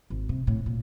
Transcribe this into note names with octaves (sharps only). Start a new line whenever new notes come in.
G#1
C3
A2
A#2